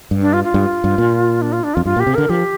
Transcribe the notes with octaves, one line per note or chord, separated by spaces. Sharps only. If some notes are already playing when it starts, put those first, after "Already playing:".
G2
D4
F4
F4
G2
G2
A#2
D4
F4
D4
F2 F4
G2 F4
A#2
G4
C3
D3 A#4
F3 G4